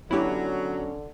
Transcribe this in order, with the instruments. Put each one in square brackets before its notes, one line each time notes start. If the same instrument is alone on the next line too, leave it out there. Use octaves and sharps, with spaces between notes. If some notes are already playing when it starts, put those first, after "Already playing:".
[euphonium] D3 [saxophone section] F#3 [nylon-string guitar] B3 C#4 D4 [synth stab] E4 G4